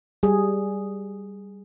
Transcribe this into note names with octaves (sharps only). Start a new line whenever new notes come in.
G3 G#4